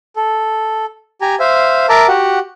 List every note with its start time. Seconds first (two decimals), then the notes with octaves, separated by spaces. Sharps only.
0.16 A4
1.21 G4 G#5 A#5
1.40 C5 E5 F5
1.89 A#4 E5 A5 A#5 D6
2.08 F#4 G4 F#5